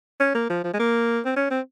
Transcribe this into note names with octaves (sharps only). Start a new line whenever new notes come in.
C#4
A#3
F3
F3
G#3
A#3
C4
C#4
C4